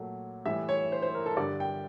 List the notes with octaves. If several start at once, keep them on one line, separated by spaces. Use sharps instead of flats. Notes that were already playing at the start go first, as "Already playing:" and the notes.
Already playing: A#2 F#3 A3
A2 E3 G3 E5
C#5
C5
C5
A#4
A4
G2 D3 G3 D5
G5